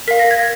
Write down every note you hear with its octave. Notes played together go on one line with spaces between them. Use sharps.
A#4 F5 B6
A#6
G#6